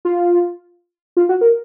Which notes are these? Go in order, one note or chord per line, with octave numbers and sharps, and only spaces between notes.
F4
F4
F#4
A#4